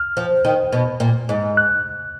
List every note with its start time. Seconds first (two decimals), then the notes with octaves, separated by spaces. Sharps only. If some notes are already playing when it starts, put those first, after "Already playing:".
Already playing: F6
0.17 F3
0.45 D#3
0.73 B2
1.00 A#2
1.29 G#2
1.57 F#6